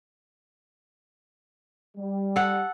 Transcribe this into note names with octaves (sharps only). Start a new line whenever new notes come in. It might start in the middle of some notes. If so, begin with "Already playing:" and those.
G3
A4 F#5